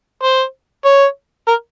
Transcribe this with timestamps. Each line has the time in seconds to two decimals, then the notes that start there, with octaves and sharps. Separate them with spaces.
0.23 C5
0.85 C#5
1.48 A#4